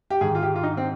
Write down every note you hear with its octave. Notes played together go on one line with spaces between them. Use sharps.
G4
G#2 D#3 G#4
F4
G4
F4
D#4
C4